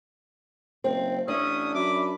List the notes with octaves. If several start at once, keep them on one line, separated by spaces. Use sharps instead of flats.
F#1 C4
A1 C#4 D4 E5 D#6
F#2 E5 B5 D6